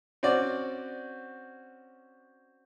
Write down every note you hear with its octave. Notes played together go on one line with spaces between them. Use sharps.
C4 C#4 F#4 D5